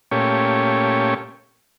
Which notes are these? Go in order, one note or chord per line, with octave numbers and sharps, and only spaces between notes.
A#2 A3 C#4 G4 C#5